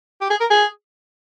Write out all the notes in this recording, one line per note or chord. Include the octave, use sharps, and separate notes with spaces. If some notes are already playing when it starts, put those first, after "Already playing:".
G4
G#4
A#4
G#4